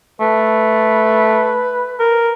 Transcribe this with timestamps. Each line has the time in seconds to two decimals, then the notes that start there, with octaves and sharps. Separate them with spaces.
0.21 A3 B4
2.00 A#4